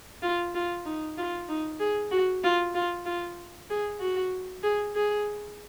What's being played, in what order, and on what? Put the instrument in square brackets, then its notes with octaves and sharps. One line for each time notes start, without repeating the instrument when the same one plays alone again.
[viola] F4
F4
D#4
F4
D#4
G#4
F#4
F4
F4
F4
G#4
F#4
G#4
G#4